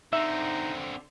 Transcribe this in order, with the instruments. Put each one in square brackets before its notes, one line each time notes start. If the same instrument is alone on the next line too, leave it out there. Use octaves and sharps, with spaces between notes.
[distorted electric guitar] D3 C4 [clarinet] D#4 [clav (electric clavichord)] E5